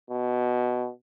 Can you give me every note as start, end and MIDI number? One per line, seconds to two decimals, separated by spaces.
0.10 0.90 47